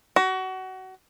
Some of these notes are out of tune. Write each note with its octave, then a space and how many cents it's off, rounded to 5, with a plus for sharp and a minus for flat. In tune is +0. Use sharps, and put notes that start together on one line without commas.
F#4 +25